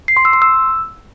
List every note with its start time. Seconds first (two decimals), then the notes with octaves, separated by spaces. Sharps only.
0.08 C7
0.17 C6
0.25 E6
0.33 C6
0.42 E6